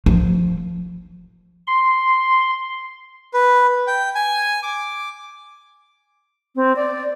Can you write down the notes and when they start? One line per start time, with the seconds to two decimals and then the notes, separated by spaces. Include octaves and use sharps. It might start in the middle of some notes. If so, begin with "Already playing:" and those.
0.06 F3
1.67 C6
3.33 B4
3.87 G5
4.15 G#5
4.63 D6
6.56 C4
6.76 D5